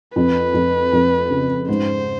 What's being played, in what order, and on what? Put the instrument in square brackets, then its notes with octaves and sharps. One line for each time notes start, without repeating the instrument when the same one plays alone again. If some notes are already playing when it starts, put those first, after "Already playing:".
[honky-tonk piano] F2 [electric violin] B4
[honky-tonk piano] F2
F2
C#3
[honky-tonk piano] G#2 [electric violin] C5